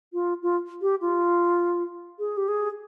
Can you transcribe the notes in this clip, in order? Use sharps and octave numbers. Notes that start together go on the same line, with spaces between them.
F4
F4
G4
F4
G#4
G4
G#4